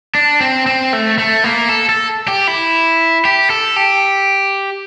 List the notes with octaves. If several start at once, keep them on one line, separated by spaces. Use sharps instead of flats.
D4
C4
C4
A3
A3
A#3
A4
A4
G4
E4
G4
A4
G4